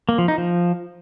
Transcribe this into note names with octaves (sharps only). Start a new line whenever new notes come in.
A#3
F3
D#4
F3